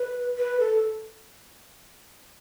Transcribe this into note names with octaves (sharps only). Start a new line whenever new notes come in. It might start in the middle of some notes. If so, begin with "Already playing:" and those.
Already playing: B4
B4
A4